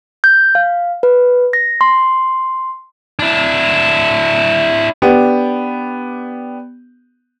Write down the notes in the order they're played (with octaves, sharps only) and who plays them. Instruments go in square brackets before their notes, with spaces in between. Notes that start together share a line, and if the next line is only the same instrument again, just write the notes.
[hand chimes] G6
F5
B4
A#6
C6
[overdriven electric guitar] D4 E4
[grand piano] B3 D4 G4